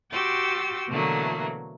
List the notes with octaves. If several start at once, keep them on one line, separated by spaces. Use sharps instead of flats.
F#4 G4 G5 C6 E6 A6
B2 D3 E3 F#3 A3 A#3